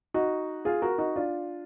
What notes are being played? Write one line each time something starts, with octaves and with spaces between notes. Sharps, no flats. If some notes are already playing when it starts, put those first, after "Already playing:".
D#4 F#4
F4 G#4
F#4 A#4
D#4 F#4
D4 F4